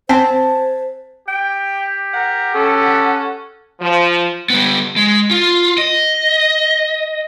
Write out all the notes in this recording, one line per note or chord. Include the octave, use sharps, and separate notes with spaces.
C4 C5 G#5 A5 B6
G4 G5
A#4 F#5
C#4 A4
F3
G3 B3
G#3
F4
D#5